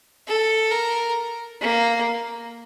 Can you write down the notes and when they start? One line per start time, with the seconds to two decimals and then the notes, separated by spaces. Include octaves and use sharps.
0.28 A4
0.71 A#4
1.61 A#3